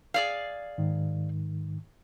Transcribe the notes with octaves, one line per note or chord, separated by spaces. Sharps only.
G#4 D5 F5
G#2 D#3